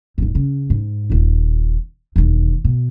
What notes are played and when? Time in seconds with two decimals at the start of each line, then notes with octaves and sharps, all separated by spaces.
0.18 D#1 A1
0.35 C#3
0.70 G#2
1.10 D#1 F4
2.16 E1 D#2
2.65 B2